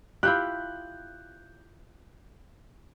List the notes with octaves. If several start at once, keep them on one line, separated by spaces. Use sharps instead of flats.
E4 F4 G4 F#6 G6